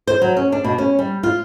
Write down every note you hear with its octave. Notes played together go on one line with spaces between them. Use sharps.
C5
F#3
C#4
D4
B2
C#4
G3
F4